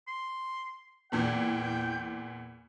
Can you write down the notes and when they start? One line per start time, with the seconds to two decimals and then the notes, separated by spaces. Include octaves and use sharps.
0.07 C6
1.12 E2 A#2 E3 G5